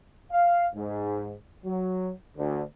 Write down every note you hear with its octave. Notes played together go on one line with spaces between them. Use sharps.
F5
G#2
F#3
D2